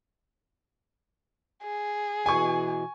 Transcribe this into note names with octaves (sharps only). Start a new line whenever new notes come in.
G#4
B2 E3 G#5 C#6